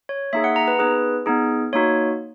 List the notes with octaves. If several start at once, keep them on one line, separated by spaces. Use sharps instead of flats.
C#5
A#3 D#4 G#4 E5
F#5
A#5
B4
B3 D#4 G#4 B4
B3 D#4 G#4
A#3 D#4 F#4 C#5